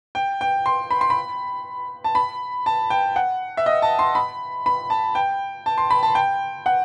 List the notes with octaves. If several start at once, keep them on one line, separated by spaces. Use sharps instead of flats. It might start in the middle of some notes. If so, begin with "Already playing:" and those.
G5
G5
C6
B5
C6
B5
A5
B5
A5
G5
F#5
E5
D#5
A5
C6
B5
B5
A5
G5
A5
C6
B5
A5
G5
F#5